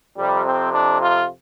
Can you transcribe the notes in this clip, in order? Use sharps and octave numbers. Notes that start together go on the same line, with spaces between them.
F2 C3 G3
C4
D4
F4